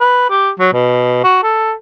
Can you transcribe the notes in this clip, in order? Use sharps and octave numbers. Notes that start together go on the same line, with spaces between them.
B4
G4
F#3
B2
F#4
A4